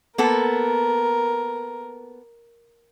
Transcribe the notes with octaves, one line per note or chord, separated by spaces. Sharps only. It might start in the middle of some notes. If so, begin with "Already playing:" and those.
A#3 B3 A4 A#4